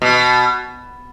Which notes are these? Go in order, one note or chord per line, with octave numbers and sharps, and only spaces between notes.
B2